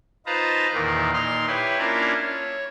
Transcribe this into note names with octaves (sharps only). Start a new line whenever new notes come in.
D#4 F4 B4 C5 A5 A#5
E2 A#2 D#3 A#3
A#2 D#4 C6 F6
E4 G4 B4 C#5
A#3 C#4 D4 E4 F4 A#4
C#5